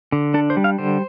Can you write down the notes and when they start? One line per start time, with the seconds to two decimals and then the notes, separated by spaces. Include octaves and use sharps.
0.12 D3
0.34 D4 A4
0.50 C5
0.57 G3
0.64 F5
0.79 D3 C5